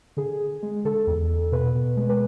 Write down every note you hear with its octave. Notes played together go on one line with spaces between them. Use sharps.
D3 G#4
D3
G#3
D3 A4
E2
E2
B2 B4
B2
G#3
B4